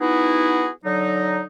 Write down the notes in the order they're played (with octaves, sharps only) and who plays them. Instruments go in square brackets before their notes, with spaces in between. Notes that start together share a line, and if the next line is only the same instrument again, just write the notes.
[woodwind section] B3 D#4 E4 F#4 G#4
D3 F#3 D#4